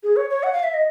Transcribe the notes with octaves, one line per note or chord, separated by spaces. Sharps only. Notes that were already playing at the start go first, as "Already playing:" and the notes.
G#4
C#5
C#5
F#5
F5
E5
D#5